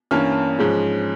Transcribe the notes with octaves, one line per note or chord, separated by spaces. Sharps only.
G2 E3 A#3 C#4 F6
G#2 F3 G#3 C#4